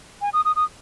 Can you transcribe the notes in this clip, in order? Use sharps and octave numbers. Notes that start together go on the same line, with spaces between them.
G#5
D#6
D#6
D#6